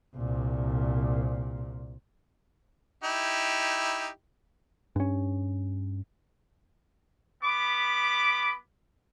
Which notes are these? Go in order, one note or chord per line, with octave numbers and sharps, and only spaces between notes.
C2 A#2
D#4 E4 G4
G2 C#4
B3 B5 D6